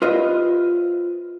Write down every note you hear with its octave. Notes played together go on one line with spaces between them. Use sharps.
F4 G4 B4 C5 D#5 E5